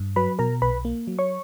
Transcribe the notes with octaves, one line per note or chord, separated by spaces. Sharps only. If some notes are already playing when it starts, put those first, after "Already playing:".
Already playing: G2
F#3 B4 B5
B2 A#4 A#5
B1 B4 B5
A#3
F#3
C#5 C#6